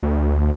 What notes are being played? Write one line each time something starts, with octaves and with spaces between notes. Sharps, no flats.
D2